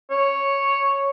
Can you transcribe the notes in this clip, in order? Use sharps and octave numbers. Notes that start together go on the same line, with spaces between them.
C#5